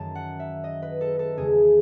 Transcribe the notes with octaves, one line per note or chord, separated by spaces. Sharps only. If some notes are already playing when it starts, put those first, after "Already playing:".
Already playing: F#2 D#3 F#3 A3 A5
F#5
E5
D#5
B4
A4
A4
E2 C#3 G#3 G#4